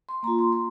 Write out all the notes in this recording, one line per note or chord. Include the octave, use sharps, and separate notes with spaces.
C6
A#3 F4 A#5
C6
C6